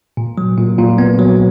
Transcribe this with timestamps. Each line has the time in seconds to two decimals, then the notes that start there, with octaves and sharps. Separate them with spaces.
0.17 A#2
0.38 F#3
0.58 A#2
0.78 A#2
0.98 B3
1.19 F#3